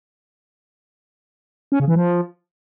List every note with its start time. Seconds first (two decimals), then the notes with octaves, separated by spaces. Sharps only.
1.72 C#4
1.80 C#3
1.88 E3
1.96 F3